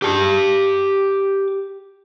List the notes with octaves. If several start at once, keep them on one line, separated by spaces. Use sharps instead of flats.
G4 A5